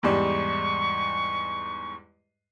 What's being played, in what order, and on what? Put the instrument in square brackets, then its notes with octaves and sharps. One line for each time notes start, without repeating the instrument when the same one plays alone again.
[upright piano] E2 G#2 G3 [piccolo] C#6